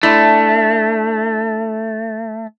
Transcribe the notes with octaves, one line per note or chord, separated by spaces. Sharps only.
A3 D4 E4